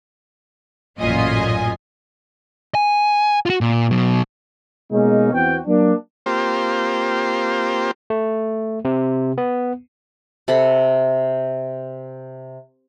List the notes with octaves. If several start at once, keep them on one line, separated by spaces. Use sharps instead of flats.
A1 F#2 A#2 F4 D#5 G#5
G#5
F4 F#4
A#2
B2 F#3
B2 G#3 A#3 C#4 D#4
E2 B3 C4 F#4 G5
F#3 A#3 D4
A#3 C4 F4 G4 C5
A3
C3
B3
C3 A4 F#5 B5